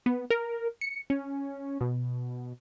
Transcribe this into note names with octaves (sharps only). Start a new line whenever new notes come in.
B3
A#4
C#7
C#4
B2